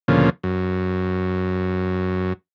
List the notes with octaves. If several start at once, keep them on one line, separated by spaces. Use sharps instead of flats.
D2 A#2 C#3 F3
F#2